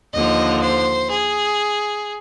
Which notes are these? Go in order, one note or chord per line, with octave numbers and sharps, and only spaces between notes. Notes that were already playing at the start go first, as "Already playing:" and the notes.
D#2 D3 F3 D#5
C5
G#4